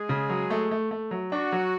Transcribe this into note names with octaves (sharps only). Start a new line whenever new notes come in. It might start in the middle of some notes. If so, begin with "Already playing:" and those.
Already playing: G#3 G#4
C#3
F#3
A3
A3
A3
F#3
D4 F#4
F#3